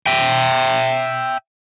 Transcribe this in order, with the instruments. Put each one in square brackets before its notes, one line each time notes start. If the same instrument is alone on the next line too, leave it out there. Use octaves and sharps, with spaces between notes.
[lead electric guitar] E5 G5